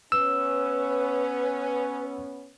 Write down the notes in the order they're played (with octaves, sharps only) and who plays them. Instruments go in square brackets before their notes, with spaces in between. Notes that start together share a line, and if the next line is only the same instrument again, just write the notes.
[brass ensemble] B3 C#4 [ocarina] B4 [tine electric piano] E6